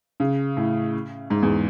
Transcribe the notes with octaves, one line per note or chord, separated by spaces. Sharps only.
C#3
A2
G#2
E2